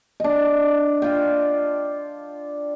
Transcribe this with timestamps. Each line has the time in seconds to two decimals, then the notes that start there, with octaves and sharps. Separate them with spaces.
0.20 D4 D#5
1.02 F4 G5